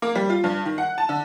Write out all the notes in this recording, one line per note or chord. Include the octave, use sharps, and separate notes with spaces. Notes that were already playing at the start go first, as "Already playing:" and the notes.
A#3
G3
F4
G2
D#3
F#5
A5
D3